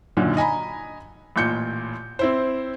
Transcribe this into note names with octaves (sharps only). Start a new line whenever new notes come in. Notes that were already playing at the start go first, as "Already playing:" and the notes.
F#2 A#2 D3 D#3
D#5 G#5 A#5 B5
A1 A#2 G6 C#7
C4 E4 C5